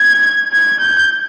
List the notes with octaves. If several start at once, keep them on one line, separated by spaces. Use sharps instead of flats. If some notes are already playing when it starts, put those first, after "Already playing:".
Already playing: G#6
G#6
G6